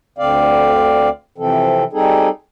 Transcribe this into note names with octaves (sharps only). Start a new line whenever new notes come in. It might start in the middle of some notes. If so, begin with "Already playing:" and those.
D2 D3 C4 D5 F5
C3 E3 F3 C4 A4
G3 C4 D#4 G#4 A4